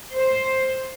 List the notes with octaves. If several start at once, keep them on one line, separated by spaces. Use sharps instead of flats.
C5